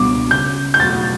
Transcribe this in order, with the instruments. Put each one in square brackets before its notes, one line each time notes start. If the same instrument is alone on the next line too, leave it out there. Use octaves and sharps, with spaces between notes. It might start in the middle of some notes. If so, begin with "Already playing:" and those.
Already playing: [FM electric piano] C#2 B2 G3 B3 D4 [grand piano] D6
[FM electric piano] C#3 G3 C#4 [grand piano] G6
[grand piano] G6
[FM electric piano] E2 B2 F#3 A3 [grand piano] A6